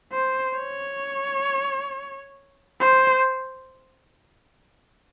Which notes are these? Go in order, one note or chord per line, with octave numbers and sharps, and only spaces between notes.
C5
C#5
C5